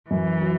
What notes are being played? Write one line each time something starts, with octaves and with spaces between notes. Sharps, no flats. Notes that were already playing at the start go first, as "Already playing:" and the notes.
F#2 E3
F#3